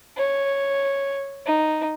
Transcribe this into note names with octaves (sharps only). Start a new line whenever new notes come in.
C#5
D#4